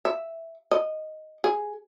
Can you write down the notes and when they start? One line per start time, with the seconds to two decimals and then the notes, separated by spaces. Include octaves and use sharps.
0.05 E5
0.71 D#5
1.44 G#4